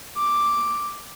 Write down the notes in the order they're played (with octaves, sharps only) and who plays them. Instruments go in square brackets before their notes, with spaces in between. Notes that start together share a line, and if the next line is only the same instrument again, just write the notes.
[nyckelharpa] D6